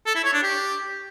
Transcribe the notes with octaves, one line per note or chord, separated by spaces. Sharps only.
A4
E4
C#5
D4
G4